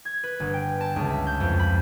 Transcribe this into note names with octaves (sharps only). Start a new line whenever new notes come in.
G#6
B4
G1
G5
A5
C#2
E5
G6
F2
B5